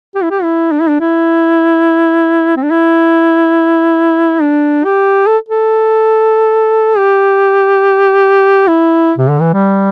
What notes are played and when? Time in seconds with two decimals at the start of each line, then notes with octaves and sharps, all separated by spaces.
0.15 G4
0.23 E4
0.31 G4
0.43 E4
0.72 D4
0.81 E4
0.89 D4
1.00 E4
2.57 C4
2.63 D4
2.71 E4
4.42 D4
4.85 G4
5.27 A4
5.48 A4
6.98 G4
8.68 E4
9.18 C3
9.30 D3
9.41 E3
9.53 G3